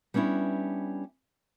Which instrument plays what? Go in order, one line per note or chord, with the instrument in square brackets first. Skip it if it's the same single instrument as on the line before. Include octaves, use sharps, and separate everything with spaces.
[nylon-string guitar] G3 B3 C#4 D4 E4